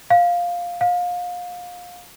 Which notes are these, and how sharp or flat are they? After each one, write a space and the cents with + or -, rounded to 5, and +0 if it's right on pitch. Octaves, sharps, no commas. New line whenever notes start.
F5 +5
F5 +30